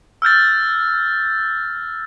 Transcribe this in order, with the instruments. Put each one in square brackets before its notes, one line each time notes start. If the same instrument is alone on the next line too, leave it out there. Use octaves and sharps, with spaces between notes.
[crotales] E6 F6 G6 A6